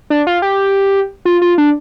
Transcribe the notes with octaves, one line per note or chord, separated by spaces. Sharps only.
D4
F4
G4
F4
F4
D4